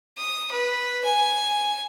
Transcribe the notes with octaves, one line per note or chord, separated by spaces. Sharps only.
D#6
B4
G#5